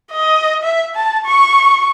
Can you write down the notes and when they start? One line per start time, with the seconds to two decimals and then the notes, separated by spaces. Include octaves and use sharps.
0.12 D#5
0.63 E5
0.96 A5
1.26 C#6